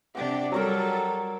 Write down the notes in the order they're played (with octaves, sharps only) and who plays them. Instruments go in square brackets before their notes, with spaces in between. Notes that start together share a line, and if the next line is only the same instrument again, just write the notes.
[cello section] C3 D4 G4 [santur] F#5 G5
[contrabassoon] F#3 [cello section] G3 A4 [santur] A#4 C#5 A#5